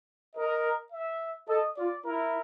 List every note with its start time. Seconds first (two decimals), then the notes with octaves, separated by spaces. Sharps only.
0.35 A#4 D#5
0.92 E5
1.48 A4 D#5
1.77 F4 D5
2.04 E4 A#4